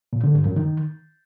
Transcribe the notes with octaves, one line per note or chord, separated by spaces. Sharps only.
A#2
D3
G2
F#2
D#3